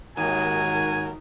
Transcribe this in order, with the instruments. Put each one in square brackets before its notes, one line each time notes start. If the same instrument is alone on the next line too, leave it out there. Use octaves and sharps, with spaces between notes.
[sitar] D#2 [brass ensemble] G#2 D#3 F#4 [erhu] A#4 [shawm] G#5